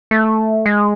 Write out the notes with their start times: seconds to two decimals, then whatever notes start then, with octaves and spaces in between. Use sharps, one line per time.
0.11 A3
0.66 G#3